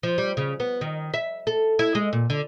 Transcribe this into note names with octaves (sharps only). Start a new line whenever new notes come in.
F3
G3
C#3
B3
D#3
E5
A4
E4
G#3
A#2
D3